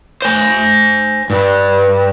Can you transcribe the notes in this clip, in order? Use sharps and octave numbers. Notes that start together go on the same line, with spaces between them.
C5 G#5
G2